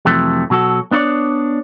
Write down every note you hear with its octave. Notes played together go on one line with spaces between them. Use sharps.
F2 C3 E3 F#3 A3
B2 F#3 F#4 A4
B3 D4 E4 C#5 D5